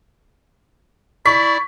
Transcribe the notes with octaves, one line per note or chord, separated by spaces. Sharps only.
E4 D5 C#6 B6